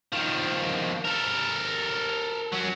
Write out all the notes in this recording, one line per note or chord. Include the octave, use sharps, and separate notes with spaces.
D#3 F3
A4 A#4
F#3 C#4